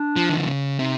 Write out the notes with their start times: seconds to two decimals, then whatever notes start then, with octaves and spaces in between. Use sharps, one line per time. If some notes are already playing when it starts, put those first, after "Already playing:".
Already playing: D4
0.16 F3
0.29 D#3
0.37 D3
0.47 C#3
0.78 C3 D#4